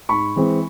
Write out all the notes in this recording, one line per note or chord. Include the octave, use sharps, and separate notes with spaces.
G#2 B5 C#6
E3 G#3 C4